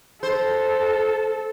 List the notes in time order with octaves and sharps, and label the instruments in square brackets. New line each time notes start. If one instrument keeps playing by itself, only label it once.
[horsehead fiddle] A4 [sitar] C5